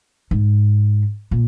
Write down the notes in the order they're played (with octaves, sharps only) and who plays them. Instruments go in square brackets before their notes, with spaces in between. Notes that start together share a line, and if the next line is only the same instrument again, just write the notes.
[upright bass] G#2
A#2